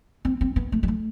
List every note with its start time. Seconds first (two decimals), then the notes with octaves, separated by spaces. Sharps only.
0.25 C4
0.41 C4
0.56 B3
0.72 A3
0.83 G3
0.88 A3